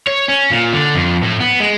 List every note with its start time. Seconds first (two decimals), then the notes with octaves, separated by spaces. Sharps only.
0.07 C#5
0.29 C#4
0.51 A#2
0.73 D3
0.95 F2
1.23 A2
1.40 B3
1.60 G#3